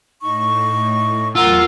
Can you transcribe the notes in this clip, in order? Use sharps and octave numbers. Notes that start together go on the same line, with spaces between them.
A2 D#4 C#6
E2 F#3 F4 A#4 F#5 A#5 E6